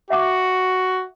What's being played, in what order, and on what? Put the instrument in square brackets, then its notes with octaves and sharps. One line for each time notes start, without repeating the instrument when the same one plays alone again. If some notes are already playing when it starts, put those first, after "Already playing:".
[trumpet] F#4 [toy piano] E5 F#5 D6